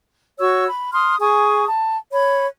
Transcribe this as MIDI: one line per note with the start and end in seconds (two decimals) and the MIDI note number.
0.39 0.67 66
0.39 0.67 73
0.39 0.67 85
0.39 0.67 88
0.67 0.89 83
0.92 1.16 84
0.92 1.16 87
0.92 1.16 89
1.19 1.65 68
1.19 1.65 80
1.19 1.65 85
1.19 1.65 87
1.66 1.97 81
2.12 2.46 73
2.12 2.46 83